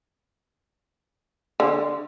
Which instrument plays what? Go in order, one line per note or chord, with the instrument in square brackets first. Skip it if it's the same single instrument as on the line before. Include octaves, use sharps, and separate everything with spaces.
[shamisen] D3